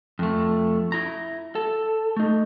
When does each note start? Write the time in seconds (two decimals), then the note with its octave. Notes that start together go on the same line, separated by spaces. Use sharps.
0.19 F2 A3
0.92 E4 A#5
1.55 A4
2.17 A3 D#4